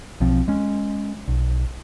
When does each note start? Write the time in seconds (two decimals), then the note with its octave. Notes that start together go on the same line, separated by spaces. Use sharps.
0.20 B1 F3 C4
0.48 G#3 C#4
1.28 B1